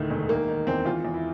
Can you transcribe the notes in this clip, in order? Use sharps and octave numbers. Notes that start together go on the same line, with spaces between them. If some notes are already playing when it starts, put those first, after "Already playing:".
Already playing: D2 A2 D#3 A3
E1
D#3 A#3
D#3
E2 C4
E2 F4
E2
E4